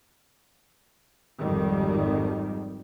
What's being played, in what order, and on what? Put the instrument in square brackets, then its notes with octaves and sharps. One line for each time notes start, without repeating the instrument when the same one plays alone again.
[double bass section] G#1 F2 D#3 G3